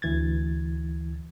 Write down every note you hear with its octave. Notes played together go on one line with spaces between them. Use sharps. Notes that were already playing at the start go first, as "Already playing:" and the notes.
D2 E3 G#6 A6